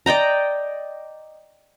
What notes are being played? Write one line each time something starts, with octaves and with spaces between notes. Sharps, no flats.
D5 D#5 G5 A#5